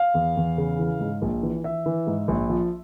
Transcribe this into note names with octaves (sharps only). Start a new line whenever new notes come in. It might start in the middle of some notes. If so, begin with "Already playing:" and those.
Already playing: F5
E2
E2
C#3
E3
G#2
A#1
E3
E3 E5
E3
G#2
A#1
F3